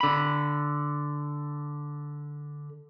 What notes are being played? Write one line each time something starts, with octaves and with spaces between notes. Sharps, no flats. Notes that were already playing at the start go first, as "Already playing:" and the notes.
D3 B5